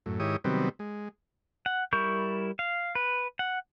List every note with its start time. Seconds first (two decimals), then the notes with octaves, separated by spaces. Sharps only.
0.06 F#2 A2
0.20 G#2 D#3 E4 G4 C#5 D#6
0.44 C3 D#3 F#3 G3 B3 C4
0.79 G#3
1.66 F#5
1.93 G3 E4 A#4 C#6 G6
2.59 F5
2.95 B4
3.39 F#5